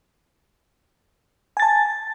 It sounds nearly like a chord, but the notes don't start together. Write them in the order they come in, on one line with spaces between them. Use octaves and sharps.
G#5 A6 A5